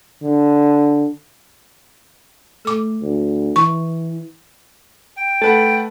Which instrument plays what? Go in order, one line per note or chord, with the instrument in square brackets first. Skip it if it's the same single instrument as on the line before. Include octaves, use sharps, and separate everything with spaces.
[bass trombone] D3
[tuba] A3 [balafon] A4 D6
[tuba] D2
[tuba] E3 [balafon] C#6
[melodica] G5
[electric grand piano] A3 B4 F#5 [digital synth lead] A4